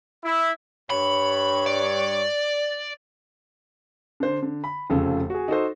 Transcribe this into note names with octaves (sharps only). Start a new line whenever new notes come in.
E4
G2 C#5 B5
D5
D3 C5
D3
B5
F1 C#3 F3 A4
F#4 G#4
D#4 F#4 A4 C5